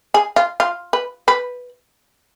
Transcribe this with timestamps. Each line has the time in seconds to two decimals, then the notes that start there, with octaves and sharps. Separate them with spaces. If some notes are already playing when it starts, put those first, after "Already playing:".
0.14 G#4
0.36 F4
0.60 F4
0.93 B4
1.28 B4